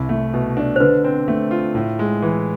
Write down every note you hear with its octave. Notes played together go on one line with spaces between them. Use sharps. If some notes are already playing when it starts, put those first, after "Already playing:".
Already playing: C2 E4
A3
B2
D4
C5
D3 B4
C4
A3
F4
A2
G#3
E3